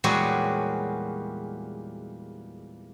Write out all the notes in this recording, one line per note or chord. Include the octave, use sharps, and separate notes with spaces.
E2 A#2 G3 G#3 F#4 C#5